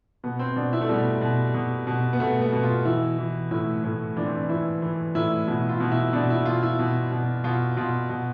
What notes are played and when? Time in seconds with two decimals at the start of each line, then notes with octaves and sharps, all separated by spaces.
0.24 B2 B3
0.39 C4
0.56 B2 D4
0.73 E4
0.81 A3
0.89 B2 G3
1.21 B2
1.54 B2
1.87 B2
2.13 B3
2.20 B2 A3
2.42 B3
2.53 B2
2.63 F4
2.85 E3 E4
3.18 E3
3.51 A2 E4
3.84 A2
4.17 E3 D4
4.25 C4
4.34 D4
4.49 E3 E4
4.82 E3
5.15 A2 E4
5.48 B2 E4
5.69 F4
5.80 B2
5.91 E4
6.13 B2 D4
6.30 E4
6.46 B2 F4
6.63 E4
6.79 B2
7.11 B2
7.44 B2 F4
7.77 B2 F4
8.10 B2